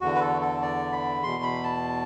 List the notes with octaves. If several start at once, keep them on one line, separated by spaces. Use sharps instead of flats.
E2 D3 F#4
B4
A4
A4
D5
B5
E2 B2 C6
B5
A5